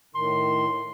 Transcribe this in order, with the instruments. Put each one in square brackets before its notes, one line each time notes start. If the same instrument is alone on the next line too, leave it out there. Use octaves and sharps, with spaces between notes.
[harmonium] A2 D#3 [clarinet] C6